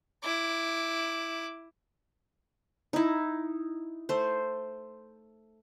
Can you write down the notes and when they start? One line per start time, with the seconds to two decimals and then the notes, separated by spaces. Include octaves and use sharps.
0.22 E4 D6
2.93 D#4 E4
4.09 A3 C5